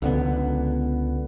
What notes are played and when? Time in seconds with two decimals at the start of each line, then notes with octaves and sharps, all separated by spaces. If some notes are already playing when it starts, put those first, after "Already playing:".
0.02 C#2 D3 B3